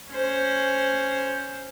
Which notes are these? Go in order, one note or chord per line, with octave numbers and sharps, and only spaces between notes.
C#4 C5